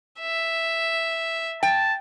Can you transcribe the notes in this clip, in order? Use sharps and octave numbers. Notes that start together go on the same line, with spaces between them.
E5
G5 A5